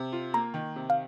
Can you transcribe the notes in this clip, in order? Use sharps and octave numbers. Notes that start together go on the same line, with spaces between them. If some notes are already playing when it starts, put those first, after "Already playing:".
Already playing: C3
F4
A#3 A#5
D#3
C3
F5